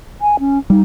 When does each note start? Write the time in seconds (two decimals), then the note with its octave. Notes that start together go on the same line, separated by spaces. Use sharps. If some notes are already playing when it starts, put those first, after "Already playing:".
0.22 G#5
0.40 C#4
0.70 G3 D#4